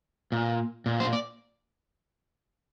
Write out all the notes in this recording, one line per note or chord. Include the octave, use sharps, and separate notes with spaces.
A#2
A#2
C5
D5